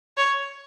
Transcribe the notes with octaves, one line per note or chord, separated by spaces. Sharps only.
C#5